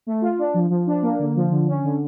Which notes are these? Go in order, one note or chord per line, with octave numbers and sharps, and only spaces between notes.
A3
F4
D4
F3
F3
D4
A#3
D3
F3
D3
C#4
D3